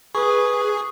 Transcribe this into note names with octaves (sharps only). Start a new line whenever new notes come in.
G#4 B4 C#6 D#6